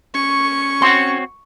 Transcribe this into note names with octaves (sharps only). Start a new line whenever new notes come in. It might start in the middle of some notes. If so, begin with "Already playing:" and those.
C#4 C#6
C4 F#4 C#5 F#5 C6